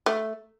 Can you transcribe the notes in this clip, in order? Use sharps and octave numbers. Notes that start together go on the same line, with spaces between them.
A3